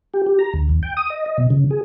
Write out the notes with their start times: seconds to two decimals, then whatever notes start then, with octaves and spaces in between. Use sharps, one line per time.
0.14 G4
0.26 G4
0.39 A#5
0.54 D2
0.69 D#2
0.83 G5
0.97 D#6
1.10 D#5
1.26 D#5
1.38 B2
1.50 C#3
1.71 G#4